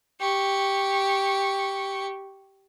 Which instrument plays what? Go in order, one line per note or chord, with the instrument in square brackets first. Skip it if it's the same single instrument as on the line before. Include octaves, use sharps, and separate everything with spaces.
[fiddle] G4 C#6